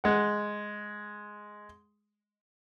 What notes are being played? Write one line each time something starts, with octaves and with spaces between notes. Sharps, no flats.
G#3 F#5